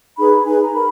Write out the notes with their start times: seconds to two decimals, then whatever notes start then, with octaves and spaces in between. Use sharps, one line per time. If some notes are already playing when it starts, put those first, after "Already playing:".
0.18 D#4 G#4 B4 B5
0.45 D#4 G#4 B4 G#5
0.60 A#5
0.74 A#4 B5